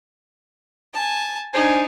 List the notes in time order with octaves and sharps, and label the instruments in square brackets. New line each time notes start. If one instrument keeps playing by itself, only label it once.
[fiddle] G#5 A5
[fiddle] D4 D#4 [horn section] C5 G#5